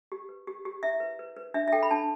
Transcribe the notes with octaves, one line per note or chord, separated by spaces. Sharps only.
G4
B4
G4
G4
E4 E5
B4
B4
B4
D4 E5
E5
A4 G5
B5
D4 A5